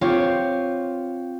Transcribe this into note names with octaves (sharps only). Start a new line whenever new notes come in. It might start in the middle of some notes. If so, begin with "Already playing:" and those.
C4 F4 G4 C#5